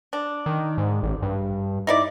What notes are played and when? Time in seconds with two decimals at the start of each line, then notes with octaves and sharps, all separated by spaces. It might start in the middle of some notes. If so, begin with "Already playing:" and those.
0.13 D4
0.46 D#3
0.78 G#2
1.03 A1
1.22 G2
1.87 D#4 E4 D5